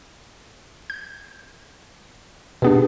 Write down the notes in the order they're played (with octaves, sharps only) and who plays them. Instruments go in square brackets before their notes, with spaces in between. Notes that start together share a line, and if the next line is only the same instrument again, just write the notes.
[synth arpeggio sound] G6
[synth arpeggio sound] B2 B3 D4 [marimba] G4 G#4 B4